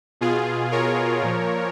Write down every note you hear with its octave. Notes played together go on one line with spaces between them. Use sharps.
B2 F4 G#4
A#4 C#5
A#2 F3